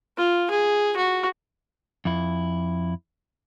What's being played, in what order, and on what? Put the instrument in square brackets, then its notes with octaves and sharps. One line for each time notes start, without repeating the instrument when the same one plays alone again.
[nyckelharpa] F4
G#4
F#4
[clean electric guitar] F2 E4